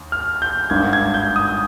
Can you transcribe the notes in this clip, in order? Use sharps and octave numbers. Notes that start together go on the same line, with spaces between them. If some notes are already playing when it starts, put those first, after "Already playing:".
Already playing: D#2
F6
G6
G#1 G2 D#3 G#6
G#6
G6
D#6